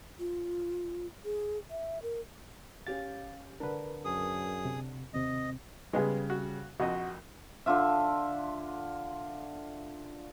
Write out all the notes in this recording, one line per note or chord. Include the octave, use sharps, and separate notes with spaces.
F4
G#4
E5
A#4
C#4 G4 F5 A6
D3 D4 A#4 B4
F#2 G#4 D#6
C3
D#2 C3 C4 D#5
C#3 G3 G#3 B3 G#4
F#4
A#1 F2 F#4 D#5
D3 D4 F4 E5